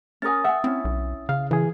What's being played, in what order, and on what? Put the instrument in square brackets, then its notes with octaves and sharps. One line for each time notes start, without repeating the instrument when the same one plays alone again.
[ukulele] C#4 A#4 G#5 [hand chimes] D#6 A6
[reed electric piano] E5 [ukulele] F#5 G#5
[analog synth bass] C4 [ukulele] C#4 E4
[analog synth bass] B1
[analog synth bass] C#3 [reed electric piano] F5
[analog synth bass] C#3 [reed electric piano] E3 G#4